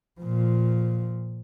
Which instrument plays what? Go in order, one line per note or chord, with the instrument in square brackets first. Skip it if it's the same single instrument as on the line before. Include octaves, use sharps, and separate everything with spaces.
[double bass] A#2 F3